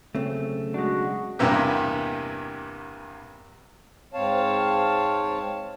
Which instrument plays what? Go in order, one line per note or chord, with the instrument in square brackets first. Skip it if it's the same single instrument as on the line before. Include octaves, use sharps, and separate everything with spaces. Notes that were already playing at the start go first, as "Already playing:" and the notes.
[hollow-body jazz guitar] B1 C#3 C4 [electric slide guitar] A3
[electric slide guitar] G#3 D4 [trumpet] F#4
[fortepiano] E2 G2 C3 A#3 B3 G4
[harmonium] G#2 C4 C#5 F5 A5